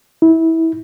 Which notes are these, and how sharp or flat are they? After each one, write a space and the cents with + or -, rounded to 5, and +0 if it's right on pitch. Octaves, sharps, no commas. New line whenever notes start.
E4 -20